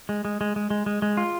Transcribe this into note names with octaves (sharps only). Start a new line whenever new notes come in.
G#3
G#3
G#3
G#3
G#3
G#3
G#3
F4